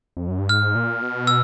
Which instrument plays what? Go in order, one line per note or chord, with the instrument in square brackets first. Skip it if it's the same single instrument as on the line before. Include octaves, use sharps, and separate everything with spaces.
[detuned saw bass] F2
F#2
G2
[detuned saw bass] G#2 [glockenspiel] F6
[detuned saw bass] A#2
B2
[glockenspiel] E6